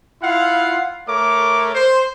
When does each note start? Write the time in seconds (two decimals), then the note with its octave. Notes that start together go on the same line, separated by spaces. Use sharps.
0.22 E4 F4 F5 F#5
1.08 A3 A#4 C#5 D6
1.75 C5